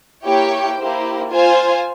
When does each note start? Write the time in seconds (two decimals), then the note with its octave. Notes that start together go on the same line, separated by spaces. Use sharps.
0.24 A#3 E4 G4 C#5 G5
0.78 A#3 E4 G4 C5
1.31 F4 C5 F5 G#5